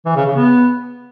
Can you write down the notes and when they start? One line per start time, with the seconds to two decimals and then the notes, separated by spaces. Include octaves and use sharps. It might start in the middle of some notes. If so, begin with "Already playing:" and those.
0.05 E3
0.16 C#3
0.26 C#3
0.36 B3